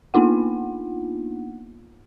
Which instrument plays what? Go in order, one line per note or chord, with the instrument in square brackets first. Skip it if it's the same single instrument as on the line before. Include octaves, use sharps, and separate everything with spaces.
[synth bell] A#3 B3 D4 D#4 F4 F#5